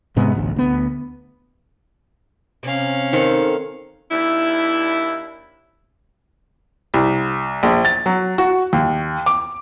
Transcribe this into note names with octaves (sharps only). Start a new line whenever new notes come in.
G#2 C3 G#3 B3
A1 D2
D2 B3
C3 C#4 F5
D#3 D#4 A4 C5 C#7
D#2 D4 E4
C2
A#1
A6
F#3
F#4
D#2
D6